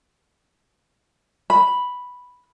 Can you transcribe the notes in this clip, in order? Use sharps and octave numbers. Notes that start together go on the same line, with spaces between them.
B5